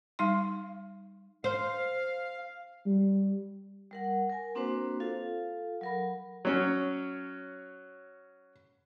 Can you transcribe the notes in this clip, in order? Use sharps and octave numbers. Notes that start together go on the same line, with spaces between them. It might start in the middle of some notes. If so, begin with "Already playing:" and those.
G3 D#4 F5 C6
C5 F5
G3
G3 A#4 F#5
A#4 G#5
A#3 C4 D4 F#4 B4 C5
F4 A4 F5
F#3 A#4 B5
F#3 C#4